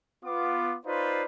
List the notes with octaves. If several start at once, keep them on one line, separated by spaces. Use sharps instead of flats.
B3 F4 D6
D#4 F4 B4 C5 D5 F5